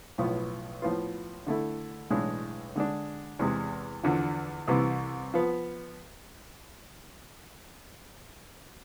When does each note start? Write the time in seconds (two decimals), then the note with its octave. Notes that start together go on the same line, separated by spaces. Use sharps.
0.18 B1 A2 F3 B3
0.82 A2 F3 B3 F4
1.47 D3 A3 E4 A4
2.10 B1 A2 E3 G#3 D4
2.76 D3 G#3 D4
3.39 E2 C3 G#3
4.03 E2 D3 F3
4.68 C2 C3 E3
5.34 F3 B3